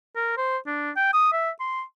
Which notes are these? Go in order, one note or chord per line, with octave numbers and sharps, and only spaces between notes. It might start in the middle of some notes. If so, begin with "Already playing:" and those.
A#4
C5
D4
G5
D#6
E5
C6